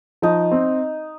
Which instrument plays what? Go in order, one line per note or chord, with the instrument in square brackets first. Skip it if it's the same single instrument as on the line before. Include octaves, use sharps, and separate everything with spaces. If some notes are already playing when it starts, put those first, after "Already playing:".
[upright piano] F3 [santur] D#4
[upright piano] C4